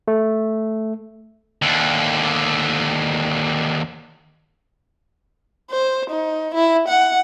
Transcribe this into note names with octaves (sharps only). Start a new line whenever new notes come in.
A3
D#2 D3
C5
D#4
E4
F#5